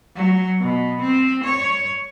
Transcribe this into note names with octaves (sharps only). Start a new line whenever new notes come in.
F#3
B2
C4
C#5